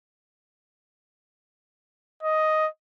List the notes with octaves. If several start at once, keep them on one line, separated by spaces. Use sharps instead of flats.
D#5